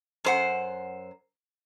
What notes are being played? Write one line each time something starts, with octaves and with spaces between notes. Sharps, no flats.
F#2 C5 F#5